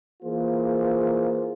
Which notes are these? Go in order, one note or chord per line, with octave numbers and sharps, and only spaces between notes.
E3 A#3 F4 G#4 C5